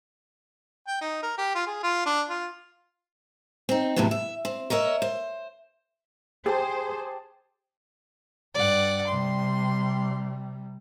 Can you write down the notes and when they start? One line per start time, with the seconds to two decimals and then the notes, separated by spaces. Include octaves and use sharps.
0.88 G5
1.01 D#4
1.23 A#4
1.38 G4
1.55 F4
1.67 G#4
1.83 F4
2.06 D4
2.29 F4
3.69 C4 D#4
3.96 E2 A2 C3 F#3 B3
4.11 E5
4.45 C4
4.70 A#4 C#5 D#5 E5
5.02 C5
6.46 G4 G#4 C5 A5
8.54 G2 D5 F#5
9.07 C3 G3 C6